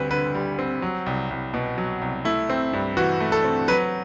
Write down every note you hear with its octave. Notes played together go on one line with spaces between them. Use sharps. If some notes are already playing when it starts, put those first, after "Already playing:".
Already playing: D2 G3 C4 B4
D3 B4
G3
C4
F#3
C2
C2
B2
F#3
C2
A3 E4
C4
G2
E3 F#4
A3
A4
C4
F#3 B4